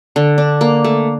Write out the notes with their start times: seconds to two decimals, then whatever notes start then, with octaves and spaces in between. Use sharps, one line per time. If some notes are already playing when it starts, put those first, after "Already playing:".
0.16 D3
0.38 D4
0.61 A#3
0.84 A3